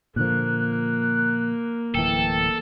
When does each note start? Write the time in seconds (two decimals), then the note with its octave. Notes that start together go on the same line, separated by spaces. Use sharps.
0.16 A#2 D3 F3 A#3 F#6
1.95 D1 E3 A4 G5